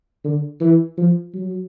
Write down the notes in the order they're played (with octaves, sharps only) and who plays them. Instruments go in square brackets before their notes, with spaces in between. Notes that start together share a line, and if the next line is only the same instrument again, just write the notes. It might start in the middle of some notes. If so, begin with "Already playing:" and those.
[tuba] D3
E3
F3
F#3